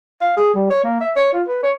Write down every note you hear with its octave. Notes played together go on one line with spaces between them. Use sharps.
F5
G#4
G3
C#5
A#3
E5
C#5
F4
B4
C#5